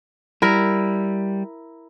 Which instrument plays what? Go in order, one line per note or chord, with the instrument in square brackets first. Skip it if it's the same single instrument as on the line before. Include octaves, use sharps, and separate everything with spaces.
[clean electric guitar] G3 [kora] E4 A#4